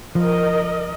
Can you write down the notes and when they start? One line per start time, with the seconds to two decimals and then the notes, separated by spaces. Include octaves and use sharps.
0.15 F3 A#4 D#5